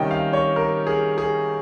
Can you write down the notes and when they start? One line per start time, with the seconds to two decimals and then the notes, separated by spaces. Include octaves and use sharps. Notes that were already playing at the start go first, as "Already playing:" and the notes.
Already playing: C3 D#3 G3 C#4 D#5 G5
0.11 F5
0.33 C#5
0.56 A#4
0.87 G#4
1.18 G#4